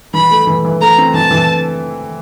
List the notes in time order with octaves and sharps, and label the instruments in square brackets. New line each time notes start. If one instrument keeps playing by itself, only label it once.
[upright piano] E3 [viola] B5
[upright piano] A3
E3
E3
[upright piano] A3 [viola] A#5
[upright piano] C4
[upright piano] E3 [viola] A5
[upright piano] E3